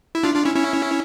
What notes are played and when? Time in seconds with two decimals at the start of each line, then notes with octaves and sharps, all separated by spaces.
0.15 E4
0.23 D4 F4
0.34 D4 F4
0.45 C#4 E4
0.55 C#4 E4